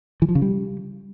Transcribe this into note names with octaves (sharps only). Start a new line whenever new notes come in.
E3
F3
C#3
G3